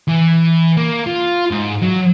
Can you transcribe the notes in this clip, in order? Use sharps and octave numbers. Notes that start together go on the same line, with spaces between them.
E3
A#3
F4
G#2
F#3